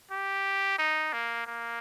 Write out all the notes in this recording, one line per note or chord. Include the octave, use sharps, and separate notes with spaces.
G4
D#4
A#3
A#3